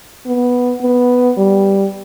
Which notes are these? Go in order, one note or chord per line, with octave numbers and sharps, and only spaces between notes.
B3
B3
G3